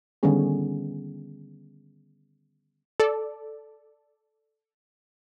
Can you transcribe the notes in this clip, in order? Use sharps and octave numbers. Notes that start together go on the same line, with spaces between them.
D3 D#3 G3 B3 C#4 G#4
A4 D5